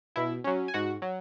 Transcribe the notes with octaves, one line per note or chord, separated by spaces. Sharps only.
B2 E4 E5
F#3 C#4
G#5
G#2 F#4 F#5
F#3